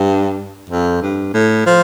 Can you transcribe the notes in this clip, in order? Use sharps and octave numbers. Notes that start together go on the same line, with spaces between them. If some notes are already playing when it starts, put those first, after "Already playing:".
Already playing: G2
F2
G2
A2
F3